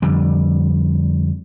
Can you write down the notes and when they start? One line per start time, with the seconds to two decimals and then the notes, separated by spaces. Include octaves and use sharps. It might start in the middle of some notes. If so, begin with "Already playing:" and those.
0.02 F2 D3 G3